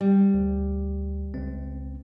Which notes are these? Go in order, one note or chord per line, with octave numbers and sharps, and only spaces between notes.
G3
D2
C#2 C4